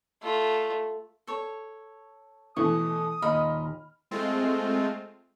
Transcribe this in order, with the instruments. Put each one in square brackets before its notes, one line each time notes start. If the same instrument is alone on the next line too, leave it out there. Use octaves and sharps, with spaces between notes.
[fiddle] A3 F4
[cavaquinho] A4 C#5
[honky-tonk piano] B2 E3 A3 [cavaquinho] C#6 [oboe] D#6
[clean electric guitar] D#2 A#2 [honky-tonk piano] D#5 F6 [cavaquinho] B5
[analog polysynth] G#3 A3 C4 F4